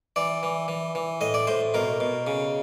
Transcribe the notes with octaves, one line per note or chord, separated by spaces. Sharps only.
E3 D5
E3
E3
E3
A2 D#5
D5
A2 C5
B2 A#4
B2
C#3